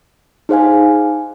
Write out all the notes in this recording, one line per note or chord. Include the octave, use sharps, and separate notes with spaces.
D#4 G#4 C5 F5 G#5